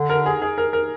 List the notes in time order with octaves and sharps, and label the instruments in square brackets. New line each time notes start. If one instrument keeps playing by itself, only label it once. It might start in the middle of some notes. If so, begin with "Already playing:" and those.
Already playing: [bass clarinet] D3
[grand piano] A#4
G#4
G#4
A#4
A#4